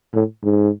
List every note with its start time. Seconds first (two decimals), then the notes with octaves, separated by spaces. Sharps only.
0.14 A2
0.43 G#2